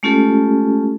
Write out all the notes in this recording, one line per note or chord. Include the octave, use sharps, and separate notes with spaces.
G#3 A3 C#4 F4 G4 A4